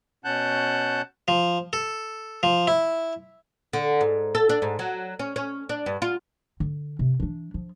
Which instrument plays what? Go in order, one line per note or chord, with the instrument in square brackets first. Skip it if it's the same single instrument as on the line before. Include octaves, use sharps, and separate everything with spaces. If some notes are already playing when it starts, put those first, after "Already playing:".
[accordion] B2 C#4 F#5 A5 F#6 G6
[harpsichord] F3
A4
F3
E4
[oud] D3
G#2
A4
D4
G#2
F#3
C#4
C#4
D4
G2
F4
[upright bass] D3
C3
E3 D4
F3